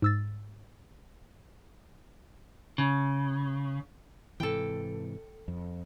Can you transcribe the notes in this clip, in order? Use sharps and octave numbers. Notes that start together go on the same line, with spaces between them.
G#2 E6 A6
C#3
G#2 C3 E3 A4 G5
F2